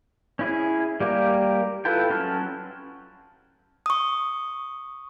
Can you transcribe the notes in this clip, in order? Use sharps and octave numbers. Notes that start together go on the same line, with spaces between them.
C#4 E4 G#4
G3 A#3 G4 A#4
E4 F4 A4 B4 G5
F#3 C#4 A5 C6 F6
C#6 D#6